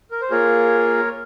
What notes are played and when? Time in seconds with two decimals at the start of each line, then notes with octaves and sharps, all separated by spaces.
0.11 A#4
0.21 C5
0.30 A#3 F4 G#4 A#4 C#5